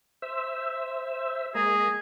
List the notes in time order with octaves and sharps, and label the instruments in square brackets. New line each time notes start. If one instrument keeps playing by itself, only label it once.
[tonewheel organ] C5 E5 E6
[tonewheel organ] G#3 A#3 A#5 [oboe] G#4